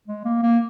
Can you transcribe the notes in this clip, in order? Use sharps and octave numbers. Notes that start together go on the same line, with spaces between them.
G#3
A#3
A#3